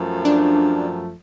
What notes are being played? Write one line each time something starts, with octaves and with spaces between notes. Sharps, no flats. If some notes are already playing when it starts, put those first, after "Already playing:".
Already playing: F#2 F3 A3
D4